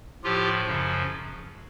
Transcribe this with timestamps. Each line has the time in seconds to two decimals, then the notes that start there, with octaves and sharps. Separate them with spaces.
0.23 A2 F3 F4 G4
0.65 F#2 C#3 F3